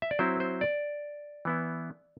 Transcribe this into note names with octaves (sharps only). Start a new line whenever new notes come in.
E5
D5
F#3 C4 E4 C5
C5
D5
E3 B3 E4